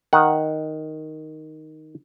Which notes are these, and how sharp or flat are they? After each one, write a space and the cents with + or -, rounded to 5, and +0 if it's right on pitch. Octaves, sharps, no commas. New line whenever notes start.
D#3 +0 F#5 +0